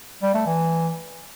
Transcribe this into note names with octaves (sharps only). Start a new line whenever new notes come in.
G3
A3
E3